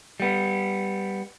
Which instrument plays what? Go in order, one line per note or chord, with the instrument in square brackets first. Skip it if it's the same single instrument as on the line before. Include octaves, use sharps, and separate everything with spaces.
[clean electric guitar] G3 B3